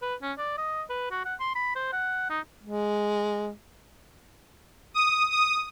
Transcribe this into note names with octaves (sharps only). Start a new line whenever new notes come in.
B4
C#4
D5
D#5
B4
F#4
F#5
C6
B5
C5
F#5
D#4
G#3
D#6
D#6